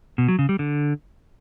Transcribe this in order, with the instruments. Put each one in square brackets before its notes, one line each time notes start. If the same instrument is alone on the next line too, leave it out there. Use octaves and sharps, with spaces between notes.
[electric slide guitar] B2
F#3
C#3
G3
D3